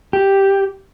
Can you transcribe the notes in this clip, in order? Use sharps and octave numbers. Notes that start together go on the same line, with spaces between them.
G4